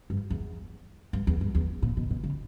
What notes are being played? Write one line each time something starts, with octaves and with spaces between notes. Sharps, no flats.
G2
E2
G2
E2
G2
E2
A#2
B2
B2
C#3